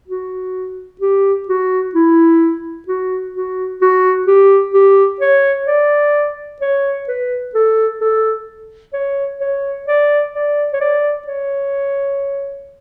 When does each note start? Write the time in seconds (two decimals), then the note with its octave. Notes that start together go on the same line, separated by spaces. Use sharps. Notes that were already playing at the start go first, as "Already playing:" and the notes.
0.08 F#4
1.01 G4
1.48 F#4
1.95 E4
2.88 F#4
3.35 F#4
3.81 F#4
4.27 G4
4.74 G4
5.20 C#5
5.67 D5
6.61 C#5
7.08 B4
7.55 A4
8.01 A4
8.94 C#5
9.41 C#5
9.88 D5
10.35 D5
10.73 C#5
10.81 D5
11.27 C#5